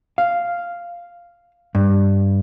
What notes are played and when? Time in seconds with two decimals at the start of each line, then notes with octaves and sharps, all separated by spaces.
0.18 F5
1.75 G2